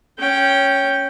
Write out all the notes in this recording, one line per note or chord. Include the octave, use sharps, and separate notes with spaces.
C#4 G5